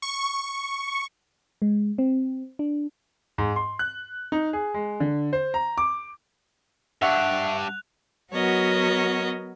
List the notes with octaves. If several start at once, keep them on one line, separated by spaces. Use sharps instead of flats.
C#6
G#3
C4
D4
G#2
C6
F#6
D#4
G#4
G#3
D3
C5
A#5
D6
G2 D4 E5 F#5 C#6 F#6 F7
F#3 B3 F#4 A#4 C#5 D#5